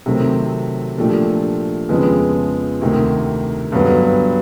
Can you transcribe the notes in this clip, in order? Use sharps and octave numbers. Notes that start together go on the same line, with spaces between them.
C3 D#3 F#3 A3 C4
A#2 F3 A3 D4 G4
F2 C#3 F3 G#3 B3
D2 C3 D#3
G2 D3 F#3 B3